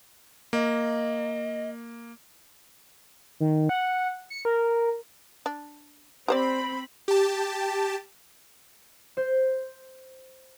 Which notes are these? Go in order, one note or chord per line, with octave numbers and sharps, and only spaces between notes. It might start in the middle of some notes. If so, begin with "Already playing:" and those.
A#3 D#5
D#3
F#5
C#7
A#4
D4
C4 G4 C5 D5 B5
G4 A5
C5